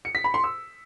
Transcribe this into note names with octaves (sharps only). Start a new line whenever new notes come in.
C#7
B6
B5
C6
E6